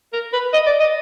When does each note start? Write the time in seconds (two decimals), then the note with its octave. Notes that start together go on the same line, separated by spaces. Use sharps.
0.13 A#4
0.33 B4
0.53 D#5
0.66 D5
0.80 D#5